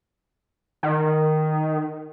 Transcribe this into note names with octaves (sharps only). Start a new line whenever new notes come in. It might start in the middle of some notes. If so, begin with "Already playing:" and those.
D#3